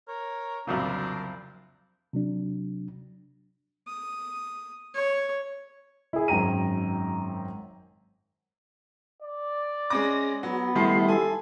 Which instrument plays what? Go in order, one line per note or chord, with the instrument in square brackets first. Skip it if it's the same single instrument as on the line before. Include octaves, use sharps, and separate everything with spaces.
[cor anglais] A#4 [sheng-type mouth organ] C#5
[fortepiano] C2 F2 A#2 [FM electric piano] C#3 F#3 [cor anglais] D4 [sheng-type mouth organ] A#4 C5
[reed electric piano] C3 F#3 D4
[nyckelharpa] D#6
C#5
[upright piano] E4 G#4
G#1 F#2 G5 A#5 D#7
[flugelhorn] D5
[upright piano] G#3 C#4 D6 [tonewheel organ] A#6
[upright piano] F#3 [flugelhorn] B3 [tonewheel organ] F#4
[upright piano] D#3 A3 A5 [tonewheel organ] G3 E4 C6
[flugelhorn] A4 [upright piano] G#5